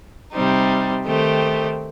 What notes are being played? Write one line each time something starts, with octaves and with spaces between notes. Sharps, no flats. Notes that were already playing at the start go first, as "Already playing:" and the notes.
C3 G3 C4 D#4
D#3 A3 C4 G4